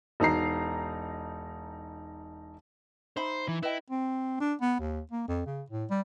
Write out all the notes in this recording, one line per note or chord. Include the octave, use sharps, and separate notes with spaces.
E1 D#4 A#5 C7
D#4 C5 E5 B5
E3
E4 B4 D#5 G5
C4
D4
B3
D#2
A#3
F2
C#3
A2
G3